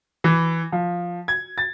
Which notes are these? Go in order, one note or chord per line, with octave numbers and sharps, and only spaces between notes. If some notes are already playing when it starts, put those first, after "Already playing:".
E3
F3
G#6
A6